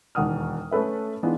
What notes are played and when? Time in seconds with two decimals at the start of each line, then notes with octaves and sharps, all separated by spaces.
0.15 E1 D#2 F#5 D#6 F6
0.71 A3 C#4 A4 B4 E5
1.23 E3 B3 D4 D#4 F4 G#4